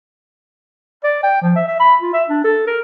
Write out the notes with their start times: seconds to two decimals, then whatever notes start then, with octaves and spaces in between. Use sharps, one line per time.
1.04 D5
1.23 G5
1.42 F3
1.56 E5
1.68 E5
1.80 B5
2.01 F4
2.13 E5
2.30 D4
2.44 A4
2.67 A#4